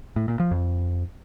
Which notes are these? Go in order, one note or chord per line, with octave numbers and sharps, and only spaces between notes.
A2
A#2
F3
F2